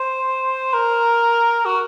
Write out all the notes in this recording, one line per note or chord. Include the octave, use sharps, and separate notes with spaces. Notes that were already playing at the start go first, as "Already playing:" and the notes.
Already playing: C5
A#4
F#4